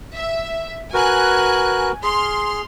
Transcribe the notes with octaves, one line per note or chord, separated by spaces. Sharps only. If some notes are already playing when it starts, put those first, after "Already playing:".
E5
F#4 A#4 B4 G#5 F#6
G#4 C6 F6